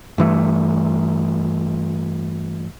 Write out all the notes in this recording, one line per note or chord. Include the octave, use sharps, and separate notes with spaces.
G2 E3 A3